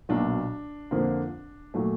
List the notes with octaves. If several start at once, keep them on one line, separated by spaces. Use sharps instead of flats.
B1 A#2 F#3 D4
F2 D3 F3 A#3
A#2 F#3 A3